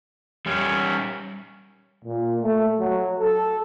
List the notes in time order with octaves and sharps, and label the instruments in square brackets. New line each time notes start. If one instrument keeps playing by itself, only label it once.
[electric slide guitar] G3 C#4
[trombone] A#2
A3
F#3
A4